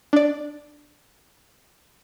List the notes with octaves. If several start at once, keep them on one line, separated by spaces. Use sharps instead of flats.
D4 D5